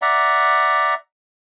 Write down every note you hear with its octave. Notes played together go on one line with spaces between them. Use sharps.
D5 E5 F#5 A#5